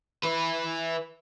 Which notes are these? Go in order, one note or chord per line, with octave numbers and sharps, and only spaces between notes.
E4 B4